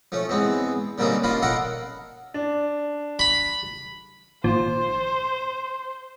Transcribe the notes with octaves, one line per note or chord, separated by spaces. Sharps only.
F3 A3 C#4
E2 G#3 B3 C4
D3 G3 A#3 C4 C#4 D#4
C#4 D4 F4 D#5 F5 B5
A4 A#4 D5 D#5 F5 F#5
D4
B5
G#1 A#2 F3 C5